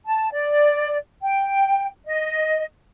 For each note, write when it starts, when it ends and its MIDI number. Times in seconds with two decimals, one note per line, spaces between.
0.06 0.30 81
0.32 0.97 74
1.22 1.87 79
2.06 2.64 75